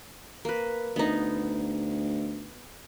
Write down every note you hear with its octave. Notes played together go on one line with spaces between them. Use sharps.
A#3 B4
D2 B3 D#4